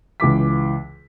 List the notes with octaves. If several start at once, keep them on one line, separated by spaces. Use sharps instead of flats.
C#2 E3 D6 B6